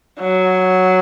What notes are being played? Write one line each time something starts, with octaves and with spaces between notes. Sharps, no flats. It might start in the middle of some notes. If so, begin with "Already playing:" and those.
F#3